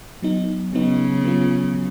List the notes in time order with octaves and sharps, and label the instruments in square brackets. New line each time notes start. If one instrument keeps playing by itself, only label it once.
[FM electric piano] F#3 B3 D#4
[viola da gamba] C#3 [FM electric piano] F#3 B3 D#4
[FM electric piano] F#3 B3 F4
F#3